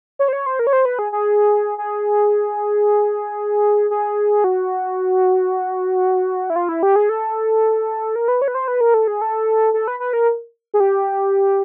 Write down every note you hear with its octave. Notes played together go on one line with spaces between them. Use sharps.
C#5
C5
C#5
C5
A#4
C#5
C5
B4
G#4
G#4
G#4
G#4
F#4
E4
F4
E4
G4
G#4
A4
A#4
B4
C#5
B4
C5
B4
A#4
A4
G#4
A4
A4
B4
B4
A#4
G#4
G4